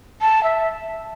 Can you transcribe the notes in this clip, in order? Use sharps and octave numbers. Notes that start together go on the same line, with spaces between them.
A5
E5